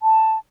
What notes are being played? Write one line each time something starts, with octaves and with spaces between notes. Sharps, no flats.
A5